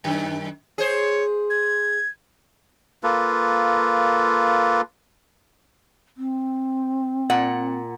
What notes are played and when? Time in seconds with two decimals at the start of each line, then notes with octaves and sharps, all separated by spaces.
0.04 F#2 D#3
0.78 G#4 C5 C#5
1.50 G#6
3.03 A#3 F4 A4 B4
6.17 C4
7.30 A#2 F#5